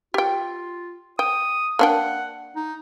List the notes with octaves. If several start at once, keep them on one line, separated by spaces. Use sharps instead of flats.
F4 G4 G5
G5 D#6
A#3 D4 F#5 G5
D#4